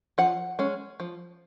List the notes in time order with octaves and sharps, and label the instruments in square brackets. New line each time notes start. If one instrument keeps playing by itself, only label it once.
[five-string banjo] F3 F#5
G#3 C#4
F3